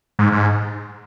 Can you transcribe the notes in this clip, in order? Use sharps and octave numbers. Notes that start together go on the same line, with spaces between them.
G#2
G#2